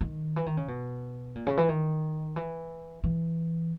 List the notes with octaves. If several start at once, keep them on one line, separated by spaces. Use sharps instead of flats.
D#3
E3
D#3
C#3
B2
A#2
C#3
E3
D#3
E3
E3